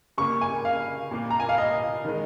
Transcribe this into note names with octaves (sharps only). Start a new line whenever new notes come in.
C#3 A#3 C#6
G#5
F5
A#2 A#3
A#5
G#5
F5
D#5
D#3 G#3